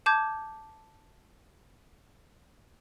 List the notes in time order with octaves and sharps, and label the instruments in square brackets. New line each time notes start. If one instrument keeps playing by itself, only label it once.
[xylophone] A5 D6 G6 G#6